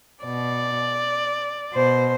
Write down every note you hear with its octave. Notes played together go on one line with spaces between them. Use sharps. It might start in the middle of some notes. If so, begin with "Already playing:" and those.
B2 D5
B2 C5